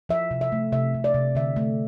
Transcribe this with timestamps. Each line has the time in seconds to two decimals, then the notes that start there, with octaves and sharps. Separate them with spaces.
0.09 F3 E5
0.31 C3
0.41 E5
0.52 A3
0.72 C3 E5
0.94 C3
1.04 D5
1.14 C3
1.35 D3 E5
1.56 A3